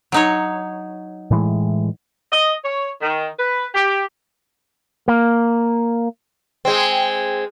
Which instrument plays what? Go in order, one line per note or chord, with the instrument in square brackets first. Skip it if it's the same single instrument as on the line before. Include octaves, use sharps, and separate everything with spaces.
[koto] F#3 D#4 C#5
[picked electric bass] A2 E3 G#3
[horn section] D#5
C#5
D#3
B4
G4
[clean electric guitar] A#3
[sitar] G#3 C4